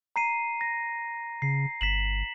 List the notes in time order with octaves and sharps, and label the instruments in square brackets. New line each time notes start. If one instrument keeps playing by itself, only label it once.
[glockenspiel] A#5 C7 D#7
A#6
[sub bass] C#3 [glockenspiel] C7
[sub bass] G1 [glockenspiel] B6 E7 F#7